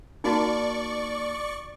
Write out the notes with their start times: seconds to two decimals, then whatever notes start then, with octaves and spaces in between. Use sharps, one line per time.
0.24 A#3 D#4 F#4 D5 A5 C#6